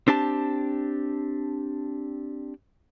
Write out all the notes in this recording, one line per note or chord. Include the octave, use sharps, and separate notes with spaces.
C4 D4 G4 A5